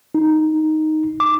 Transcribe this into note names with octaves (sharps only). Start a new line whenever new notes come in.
D#4
D6